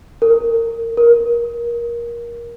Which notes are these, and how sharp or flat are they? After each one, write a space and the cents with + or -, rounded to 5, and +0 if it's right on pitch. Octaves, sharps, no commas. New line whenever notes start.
A#4 -25
A#4 +20